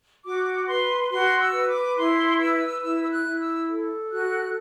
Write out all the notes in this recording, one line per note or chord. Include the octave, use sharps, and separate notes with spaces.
F#4 D6
B4 C6
F#4 C6
E6
B4
D6
E4 C6
B4 E6
E4 E6
E6
F#6
E4
E6
A4
F#4 F#6